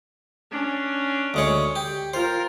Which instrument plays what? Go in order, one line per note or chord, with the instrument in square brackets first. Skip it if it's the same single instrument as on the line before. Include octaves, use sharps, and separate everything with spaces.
[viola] C#4 D4
[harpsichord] D2 G#3 C#5
G4
[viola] F4 A#4 [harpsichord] C5